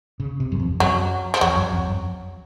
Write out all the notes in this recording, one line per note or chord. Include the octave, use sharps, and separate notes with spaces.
C#3
C3
F#2
F2
F#2 F#3
F3
F2 F#3
F#2
F2
F#2